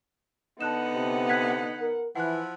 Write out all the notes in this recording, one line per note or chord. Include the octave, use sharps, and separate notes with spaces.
D3 B3 D#4 F#5 A5 F#6 E7
C3
F#6 G#6 B6
A#4
E3 F3 E4 F#5 F#6